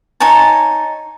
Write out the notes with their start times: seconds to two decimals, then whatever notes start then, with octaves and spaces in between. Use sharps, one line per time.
0.20 D#4 C#5 G#5 A5